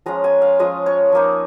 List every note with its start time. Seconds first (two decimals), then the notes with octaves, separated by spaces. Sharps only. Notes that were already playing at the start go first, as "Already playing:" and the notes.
0.06 F3 G#3 C#4 F4 A#5
0.24 G#5
0.42 F5
0.59 F3 G#3 C#4 F4 D#5
0.86 C#5
1.12 F3 A#3 D#4